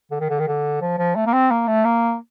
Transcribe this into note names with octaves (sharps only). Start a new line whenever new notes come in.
D3
D#3
D3
D#3
D3
F3
F3
A3
A#3
C4
A#3
A3
A#3